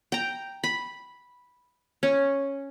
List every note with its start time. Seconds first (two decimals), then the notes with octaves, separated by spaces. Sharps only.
0.12 G5 A#5
0.64 B5
2.03 C#4